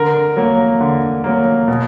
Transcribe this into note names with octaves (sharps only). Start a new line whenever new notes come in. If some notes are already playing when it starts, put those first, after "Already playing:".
Already playing: D3 A#4
F#3 A#3
D3
F#3 A#3
B2